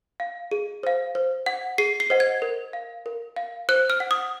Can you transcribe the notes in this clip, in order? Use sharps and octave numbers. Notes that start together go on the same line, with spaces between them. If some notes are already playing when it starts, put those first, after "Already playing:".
F5
G#4
C5 F5
C5
F#5
G#4 C7
C7
C5 D#5 F#5
G#6
A#4
F5
A#4
F5
C5 F#6
F6
F#5
D#6